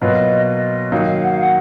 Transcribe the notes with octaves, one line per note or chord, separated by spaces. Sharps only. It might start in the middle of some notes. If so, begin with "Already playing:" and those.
B2 F#3 A#3 F4 B4 D#5
D#5
D#3 F#3 A#3 D#4 F5
D#5
F5
F#5
F5
F#5